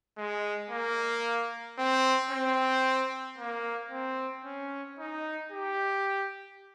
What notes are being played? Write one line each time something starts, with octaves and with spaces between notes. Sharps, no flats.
G#3
A#3
C4
C4
A#3
C4
C#4
D#4
G4